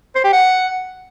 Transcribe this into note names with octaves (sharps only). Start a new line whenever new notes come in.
C5
G4
F#5